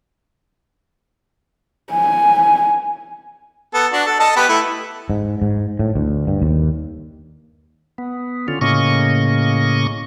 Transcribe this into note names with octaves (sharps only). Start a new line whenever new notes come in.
G#5
B3 A4
D4 F#4
A4
A4 D#5 A5
B3 G4 B4
A3 E4
G#2
G#2
A2
D2
G2
D#2
B3
D3 C#4 F4
A2 C#3 A#3 C#4 D#5 C#6